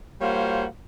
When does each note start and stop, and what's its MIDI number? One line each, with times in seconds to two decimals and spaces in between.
0.21 0.65 55
0.21 0.65 58
0.21 0.65 65
0.21 0.65 66
0.21 0.65 72
0.21 0.65 73